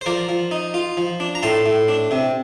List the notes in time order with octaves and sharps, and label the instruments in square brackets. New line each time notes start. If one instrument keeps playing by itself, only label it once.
[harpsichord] C5
F3 A#4 D5
F3
D#4
F4
F3
D4
A#5
A2 A5 C6
A2
D4
C3